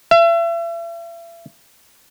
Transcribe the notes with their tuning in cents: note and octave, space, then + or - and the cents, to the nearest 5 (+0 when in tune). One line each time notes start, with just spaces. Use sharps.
E5 +40